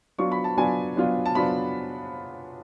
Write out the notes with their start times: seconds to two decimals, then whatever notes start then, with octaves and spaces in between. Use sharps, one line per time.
0.18 F#3 B3 D4 F4 C#6
0.32 B5
0.44 A5
0.57 F#3 B3 D4 F4 G#5
0.96 F#3 B3 D4 F4
1.26 A5
1.35 F#3 B3 D4 F4 B5